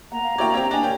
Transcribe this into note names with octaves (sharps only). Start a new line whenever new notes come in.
A#3 F#5 A#5
F5
A#3 E4 F#4 C#5 D5 G5
C4 G4 C#5
A#3 D4 D#5 G#5
G4 C#5 G5